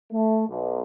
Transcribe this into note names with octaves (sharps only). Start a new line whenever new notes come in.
A3
B1